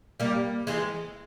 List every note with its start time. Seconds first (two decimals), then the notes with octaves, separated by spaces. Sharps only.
0.20 G3 A#3
0.67 E3 G#3